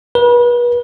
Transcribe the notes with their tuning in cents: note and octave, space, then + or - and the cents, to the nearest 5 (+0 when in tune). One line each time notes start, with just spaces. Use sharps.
B4 -35